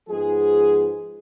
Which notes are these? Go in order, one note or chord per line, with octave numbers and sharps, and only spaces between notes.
G#2 F3 G#3 B3 G#4